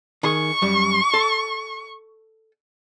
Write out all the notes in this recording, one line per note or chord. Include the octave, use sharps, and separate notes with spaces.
D#3 G#4 C#6
F#2 G3
A4